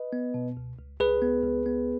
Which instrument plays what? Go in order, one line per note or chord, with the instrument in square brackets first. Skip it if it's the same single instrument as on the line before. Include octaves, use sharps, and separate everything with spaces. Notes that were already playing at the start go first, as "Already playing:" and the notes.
Already playing: [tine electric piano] B4 D#5
B3
B2
C#2
C#2
C#2 G#4 B4
B3
C#2
B3